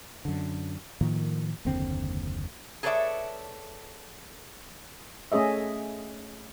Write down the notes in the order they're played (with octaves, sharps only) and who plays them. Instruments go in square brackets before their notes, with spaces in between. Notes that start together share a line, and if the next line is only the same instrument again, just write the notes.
[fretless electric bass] F#2 D3
A2 D#3 F3 A#3
F#1 D#2 D3 C4
[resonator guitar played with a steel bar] G#4 A4 B4 C#5 D5 E5
[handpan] A3 C#4 G#4 D#5 E5